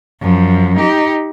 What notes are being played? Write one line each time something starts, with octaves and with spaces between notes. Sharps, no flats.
F#2 F3
D#4 G4